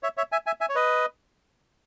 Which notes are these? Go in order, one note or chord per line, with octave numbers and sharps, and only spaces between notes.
C#5 E5
C#5 E5
E5 G#5
E5 G#5
E5 G#5
C#5
B4 D#5